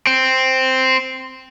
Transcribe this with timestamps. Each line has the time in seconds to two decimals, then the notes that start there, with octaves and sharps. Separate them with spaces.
0.07 C4